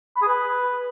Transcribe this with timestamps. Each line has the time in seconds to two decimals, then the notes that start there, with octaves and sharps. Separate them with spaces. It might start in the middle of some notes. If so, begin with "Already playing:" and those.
0.16 B5
0.22 G#4
0.28 B4